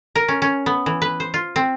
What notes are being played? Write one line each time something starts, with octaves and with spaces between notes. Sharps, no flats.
A#4
C#4
C#4
B3
E3
B4
C5
F4
C4